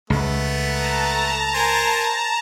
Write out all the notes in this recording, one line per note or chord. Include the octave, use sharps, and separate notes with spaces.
C#2 A3 B3
A5 A#5
A#4 C5 G#5